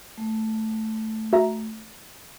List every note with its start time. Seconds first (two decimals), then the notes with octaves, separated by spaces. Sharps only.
0.18 A3
1.33 F#4 E5 A#5